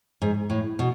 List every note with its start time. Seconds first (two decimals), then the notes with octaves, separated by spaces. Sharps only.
0.22 G#2
0.50 A2
0.79 B2